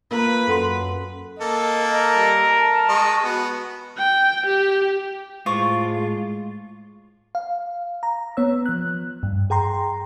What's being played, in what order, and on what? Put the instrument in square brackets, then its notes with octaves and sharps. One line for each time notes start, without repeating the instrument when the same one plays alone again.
[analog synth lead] A#3 [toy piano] F4 A#4 A#5 [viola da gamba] B4
[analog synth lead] F#2 [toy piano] A4 F#5 C6
[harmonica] A#3 A4 [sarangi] D#5
[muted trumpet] A#4
[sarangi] G3
A5
[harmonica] G#3 D#5 C#6
[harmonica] B3 [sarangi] F#4
[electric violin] G5
G4
[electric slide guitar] A2 F4 [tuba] G#3 [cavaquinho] C5 C#6 D6
[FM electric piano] F5
A#5
B3 C#5 E6
F3 F#6
G2
G#4 G5 A#5 C6